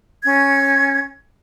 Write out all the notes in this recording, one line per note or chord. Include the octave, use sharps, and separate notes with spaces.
C#4 G#6